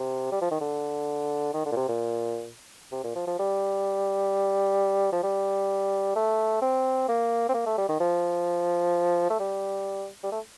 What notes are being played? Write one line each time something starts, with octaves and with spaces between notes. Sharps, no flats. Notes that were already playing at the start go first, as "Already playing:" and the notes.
Already playing: C3
G3
F3
D#3
D3
D#3
D3
A#2
C3
A#2
C3
A#2
F3
F3
G3
F3
G3
A3
C4
A#3
C4
A#3
A3
G3
D#3
F3
A3
G3
G3
A3